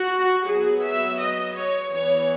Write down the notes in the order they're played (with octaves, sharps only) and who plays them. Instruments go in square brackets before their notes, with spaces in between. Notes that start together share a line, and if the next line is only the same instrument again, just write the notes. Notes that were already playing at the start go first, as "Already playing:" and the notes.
Already playing: [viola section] F#4
F#3 B3 G#4
E5
D#5
C#5
E3 B3 C#5